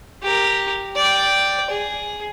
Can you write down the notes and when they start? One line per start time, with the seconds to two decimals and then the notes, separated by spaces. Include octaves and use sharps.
0.23 G4 A#4
0.96 D5 G5
1.70 G#4